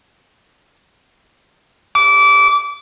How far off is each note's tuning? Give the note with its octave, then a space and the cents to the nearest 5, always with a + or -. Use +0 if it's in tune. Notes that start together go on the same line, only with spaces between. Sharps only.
D6 -25